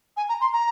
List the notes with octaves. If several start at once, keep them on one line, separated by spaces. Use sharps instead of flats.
G#5
A#5
C6
A#5